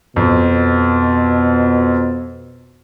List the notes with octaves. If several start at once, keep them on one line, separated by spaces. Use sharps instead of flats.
F2 B2